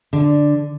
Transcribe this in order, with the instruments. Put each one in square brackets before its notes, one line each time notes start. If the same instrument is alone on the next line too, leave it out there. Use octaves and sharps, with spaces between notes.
[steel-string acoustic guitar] D3